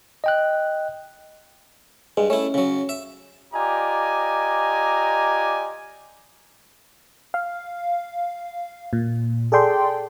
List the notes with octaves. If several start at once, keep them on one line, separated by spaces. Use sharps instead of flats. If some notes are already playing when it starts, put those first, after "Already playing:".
D#5 G5 F#6
G2 G#3
A3 C#4 E4
C#3 F#3
E5
F4 G4 D5 D#5 G#5 A#5
F5
A#2
G#4 A4 D5 G5 C6